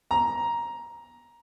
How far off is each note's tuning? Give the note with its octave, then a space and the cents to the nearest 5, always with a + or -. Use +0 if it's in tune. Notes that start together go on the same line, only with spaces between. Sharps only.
A#5 +10